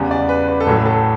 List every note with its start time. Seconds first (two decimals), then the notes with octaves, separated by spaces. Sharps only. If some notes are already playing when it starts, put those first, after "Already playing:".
Already playing: E2 C#3 G3 B3
0.11 D5
0.29 B4
0.48 B4
0.60 A4
0.67 A1 A2 F#3 A3
0.86 A4